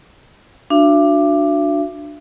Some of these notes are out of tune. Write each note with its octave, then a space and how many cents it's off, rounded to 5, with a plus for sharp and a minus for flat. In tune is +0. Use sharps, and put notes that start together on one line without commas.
D4 +10 F#4 -25 E5 +45